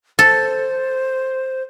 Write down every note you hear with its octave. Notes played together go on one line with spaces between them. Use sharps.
A4 C5